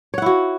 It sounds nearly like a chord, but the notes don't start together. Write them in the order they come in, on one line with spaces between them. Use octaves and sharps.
C#5 F#5 E4 F#4